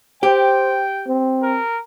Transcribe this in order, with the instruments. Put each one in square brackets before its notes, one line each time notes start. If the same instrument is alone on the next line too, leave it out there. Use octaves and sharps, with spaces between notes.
[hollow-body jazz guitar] G4 [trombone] C5 [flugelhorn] G5
[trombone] C4
[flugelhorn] A#4